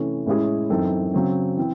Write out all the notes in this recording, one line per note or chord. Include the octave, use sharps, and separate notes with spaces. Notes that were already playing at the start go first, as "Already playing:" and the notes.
Already playing: C3 E3 A3 C#4
A2 G#3 C#4 E4 G#4
F#2 E3 C4 D#4 A4
C#3 F#3 C4
E3 C4